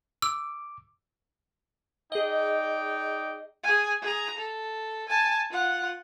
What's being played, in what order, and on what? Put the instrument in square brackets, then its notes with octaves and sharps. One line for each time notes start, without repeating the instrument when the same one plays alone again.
[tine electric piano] D6 [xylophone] E6
[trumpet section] D#4 D5 G5 [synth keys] G#4 D#5
[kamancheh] G#4 G#5
G#4 A#5
A4
G#5 A5
F4 F#5